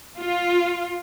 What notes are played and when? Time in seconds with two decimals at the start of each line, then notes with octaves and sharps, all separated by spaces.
0.17 F4